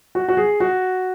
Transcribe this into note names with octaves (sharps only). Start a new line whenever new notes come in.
F#4
F#4
G#4
F#4